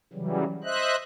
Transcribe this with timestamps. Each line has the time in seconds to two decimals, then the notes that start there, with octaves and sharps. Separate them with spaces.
0.13 C#3 E3 F#3 G3
0.64 C5 D#5 E5 F#6